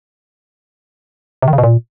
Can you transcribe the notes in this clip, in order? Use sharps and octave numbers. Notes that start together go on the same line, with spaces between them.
C3
D#3
C#3
B2
A#2